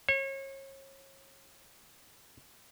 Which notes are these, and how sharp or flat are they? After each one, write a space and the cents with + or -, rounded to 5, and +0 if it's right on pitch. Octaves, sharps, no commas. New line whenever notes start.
C#5 -35